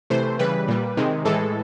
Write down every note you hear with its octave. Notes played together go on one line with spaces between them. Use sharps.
C3 E3 A3 C5
C#3 E3 G3 B4
A#2 G3
C3 D#3 G#3
A2 E3 G#3 A4